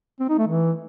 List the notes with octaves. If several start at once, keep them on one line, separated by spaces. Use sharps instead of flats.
C4
D#4
A3
E3